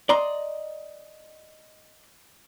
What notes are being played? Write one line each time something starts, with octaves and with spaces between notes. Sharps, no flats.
D5 D#5 A#5 C6